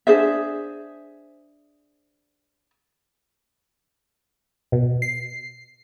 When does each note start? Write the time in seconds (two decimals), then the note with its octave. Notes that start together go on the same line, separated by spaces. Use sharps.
0.07 D4 G#4 C5 E5
4.72 B2
5.02 C7